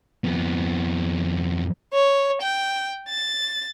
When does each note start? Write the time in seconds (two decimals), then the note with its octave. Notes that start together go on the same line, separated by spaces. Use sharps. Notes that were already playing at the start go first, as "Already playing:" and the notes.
0.24 F2 B3
1.93 C#5
2.41 G5
3.09 A6